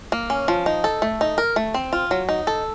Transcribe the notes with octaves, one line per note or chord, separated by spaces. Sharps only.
A#3
C#4
F3
D#4
A4
A3
D#4
A#4
A3
C4
F4
F#3
D#4
A4